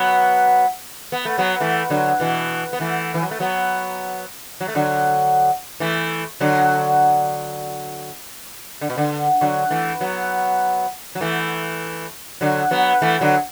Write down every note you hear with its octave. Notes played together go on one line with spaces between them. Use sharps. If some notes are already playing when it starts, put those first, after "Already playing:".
Already playing: F#3 B3
B3
A3
F#3 B3
E3 A3
D3 F#3
B2 E3
B3
E3 A3
E3
F#3
A3
F#3 B3
F#3
A3
D3 F#3
E3 A3
D3 F#3
D3
B2
D3
D3 F#3
E3 A3
F#3 B3
F#3
E3 A3
D3 F#3
F#3 B3
E3 A3
D3 F#3